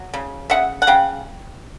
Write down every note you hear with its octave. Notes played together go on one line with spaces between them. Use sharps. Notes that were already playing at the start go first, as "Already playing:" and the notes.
Already playing: F#3
C#3
C#3 E5 F#5
F#5
C#3 F5 G5